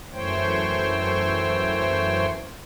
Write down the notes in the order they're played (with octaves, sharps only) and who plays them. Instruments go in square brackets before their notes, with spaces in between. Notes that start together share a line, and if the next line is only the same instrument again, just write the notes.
[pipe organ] F#2 E3 A3 C5 C#5 G5